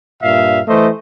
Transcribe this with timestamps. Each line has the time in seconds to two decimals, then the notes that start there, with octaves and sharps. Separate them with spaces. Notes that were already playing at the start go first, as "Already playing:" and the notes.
0.22 G2 A#2 E5 F5
0.68 E3 A3 C5 D#5